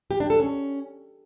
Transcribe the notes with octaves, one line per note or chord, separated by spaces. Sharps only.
G4
D4
A4
C#4